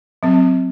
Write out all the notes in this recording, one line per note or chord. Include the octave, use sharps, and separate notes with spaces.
F#3 C4